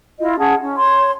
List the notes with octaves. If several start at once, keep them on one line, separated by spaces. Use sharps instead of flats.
E4 F4 D#5
C#4 G#4 F#5 A5
C#4
C#5 C6